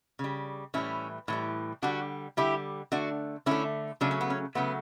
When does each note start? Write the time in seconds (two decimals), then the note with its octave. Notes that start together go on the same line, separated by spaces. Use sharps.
0.19 C#3 G3
0.74 A2 E3 G3 C#4 E4
1.28 A2 E3 G3
1.82 D3 G3 D4 F#4
2.37 D3 G3 E4 G4
2.92 D3 A3 D4 F#4
3.46 D3 A3 C#4 E4
4.01 C#3 F#3 A3 D4
4.11 C#4
4.21 B3
4.30 C#4
4.55 C#3 F#3 A3 B3